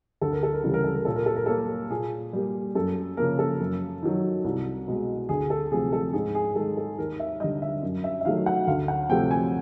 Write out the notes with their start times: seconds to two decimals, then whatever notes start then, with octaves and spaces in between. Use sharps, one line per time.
0.21 D2 A4
0.32 A#4
0.43 A4
0.53 A#4
0.64 C#3 E3 G3 A4
0.74 A#4
0.84 A4
0.95 A#4
1.05 A#2 A4
1.16 A#4
1.26 A4
1.36 A#4
1.46 G3 A#3 A4
1.90 A#2 G#4
2.33 G3 A#3
2.75 F#2 A4
3.17 C#3 F3 A#3 A#4
3.39 A4
3.60 F#2
4.03 D#3 F#3
4.44 C2
4.87 B2 G#3
5.29 D2 G#4
5.50 A4
5.72 C3 F3 A3 G#4
5.93 A4
6.13 G#2 G#4
6.35 G#4
6.56 D#3 G#3 A4
6.77 A4
6.98 D#2 A#4
7.20 E5
7.40 D3 G3 D#5
7.62 E5
7.83 F#2
8.04 E5
8.21 E5
8.25 D#3 F#3 A3 F5
8.46 F#5
8.67 D2 F5
8.88 F#5
9.10 C3 F3 A3 G5
9.31 G#5